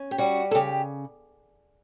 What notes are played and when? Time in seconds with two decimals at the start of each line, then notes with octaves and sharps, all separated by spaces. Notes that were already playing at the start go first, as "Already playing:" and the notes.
Already playing: C#4
0.11 G4
0.18 G3 F#4
0.51 A4
0.55 C#3 G4